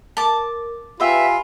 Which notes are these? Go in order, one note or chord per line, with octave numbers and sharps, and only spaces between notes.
A#4 A5 D6
F4 G4 B4 E5 G5 G#5 B5